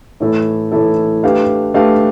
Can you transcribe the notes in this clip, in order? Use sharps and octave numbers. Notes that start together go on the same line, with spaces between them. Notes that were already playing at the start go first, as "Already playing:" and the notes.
A2 E3 A3 E4 A4
A2 E3 A3 E4 A4
A3 D4 G4 B4 F5
A3 D4 G4 B4 F5